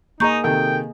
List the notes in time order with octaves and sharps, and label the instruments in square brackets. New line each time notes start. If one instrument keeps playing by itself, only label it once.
[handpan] A#3 G#4 D#5 [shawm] D#4 [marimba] A#5 C#6 G6
[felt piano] C3 D#3 A4 [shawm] G5